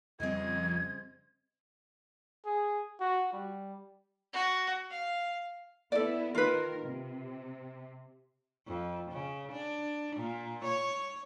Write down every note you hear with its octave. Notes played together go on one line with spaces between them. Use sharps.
F2 C#3 G3 C4 D#5 G#6
G#4
F#4
G3
F#4
F5
B3 E4 A4 D5
D#3 F4 A#4 B4
C3
F2
C#3
D4
A#2
C#5